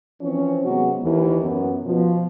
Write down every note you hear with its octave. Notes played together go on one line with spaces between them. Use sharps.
E3 F3 C4 C#4
C3 F#3 G#3 B3 F#4
D#2 E3
F#2 B3
B2 F3